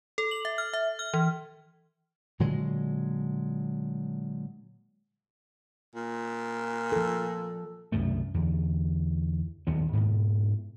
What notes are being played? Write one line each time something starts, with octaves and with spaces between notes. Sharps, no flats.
A4
F#7
E5
F6
E5
F6
E3
A#2 D3 F#3 G#3
A#2
F3 A4
C2 F#2 B2 A3
E2 D3
D#1 D#2 F#3 B3
G#2 B2